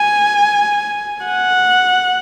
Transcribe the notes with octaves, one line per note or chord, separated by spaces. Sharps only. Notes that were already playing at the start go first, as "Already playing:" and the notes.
Already playing: G#5
F#5